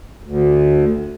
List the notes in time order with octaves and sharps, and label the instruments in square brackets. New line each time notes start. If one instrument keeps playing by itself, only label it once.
[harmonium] D2